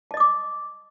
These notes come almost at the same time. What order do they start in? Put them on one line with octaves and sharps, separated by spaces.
A5 D#5 D#6 D6